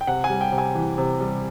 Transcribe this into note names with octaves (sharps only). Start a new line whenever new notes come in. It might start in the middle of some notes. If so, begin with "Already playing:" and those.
G5
C3 F#5
G#5
G3
G5
C3
G#5
E3
C3
G3